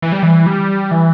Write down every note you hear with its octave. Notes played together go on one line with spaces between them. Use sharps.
E3
G3
E3
G3
E3